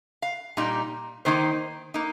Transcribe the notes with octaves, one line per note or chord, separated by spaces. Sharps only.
F5
A#2 G3 D#4
D#3 A#3 D#4 C5
A#3 D#4